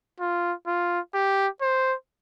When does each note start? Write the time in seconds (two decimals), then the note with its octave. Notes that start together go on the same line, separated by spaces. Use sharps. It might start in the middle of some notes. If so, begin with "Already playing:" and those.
0.20 F4
0.67 F4
1.14 G4
1.61 C5